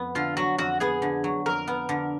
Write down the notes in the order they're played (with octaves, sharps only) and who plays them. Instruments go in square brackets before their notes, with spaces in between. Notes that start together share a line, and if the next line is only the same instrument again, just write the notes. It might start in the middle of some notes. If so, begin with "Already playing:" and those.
Already playing: [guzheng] F2 B3
[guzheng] D3 [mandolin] F4
[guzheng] F#3 [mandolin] F#4
[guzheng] F2 [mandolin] F#4
[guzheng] B3 [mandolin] G#4
[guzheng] D3
F#3
[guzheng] F2 [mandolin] A#4
[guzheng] B3
D3